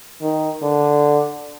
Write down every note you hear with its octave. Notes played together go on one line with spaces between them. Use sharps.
D#3
D3